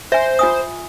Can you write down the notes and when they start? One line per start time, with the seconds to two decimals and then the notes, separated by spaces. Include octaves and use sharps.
0.12 C5 E5 G#5
0.39 F4 G#5 D#6